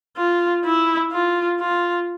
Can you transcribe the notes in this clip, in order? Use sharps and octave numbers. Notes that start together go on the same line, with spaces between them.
F4
E4
F4
F4